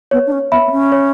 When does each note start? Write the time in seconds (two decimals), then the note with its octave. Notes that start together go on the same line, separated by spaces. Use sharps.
0.11 B3 C#5
0.26 D4
0.32 C#4
0.52 B3 E5 B5
0.67 B3
0.72 C#4
0.92 C#5